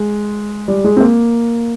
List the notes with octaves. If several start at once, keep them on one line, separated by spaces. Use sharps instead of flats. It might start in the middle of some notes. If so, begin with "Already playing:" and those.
Already playing: G#3
G3
G#3
C4
A#3